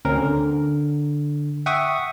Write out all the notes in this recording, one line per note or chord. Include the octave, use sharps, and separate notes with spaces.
D2 C4 C#4 A#4
D3
E5 F#5 G5 C#6 D#6